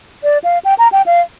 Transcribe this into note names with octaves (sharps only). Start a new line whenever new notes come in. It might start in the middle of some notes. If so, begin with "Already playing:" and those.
D5
F5
G5
A#5
G5
F5